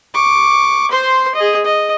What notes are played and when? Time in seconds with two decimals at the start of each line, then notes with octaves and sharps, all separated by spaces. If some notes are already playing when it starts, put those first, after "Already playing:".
0.14 C#6 D6
0.91 C5 C6
1.35 G#4 D#5
1.65 D#5